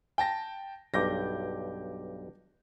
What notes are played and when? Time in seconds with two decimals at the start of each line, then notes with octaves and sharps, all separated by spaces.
0.18 G5 A5 A#6
0.94 B1 G2 D6 G6 A#6